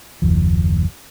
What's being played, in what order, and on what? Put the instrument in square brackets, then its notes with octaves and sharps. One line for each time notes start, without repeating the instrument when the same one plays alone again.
[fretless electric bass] F#1 D#2 F3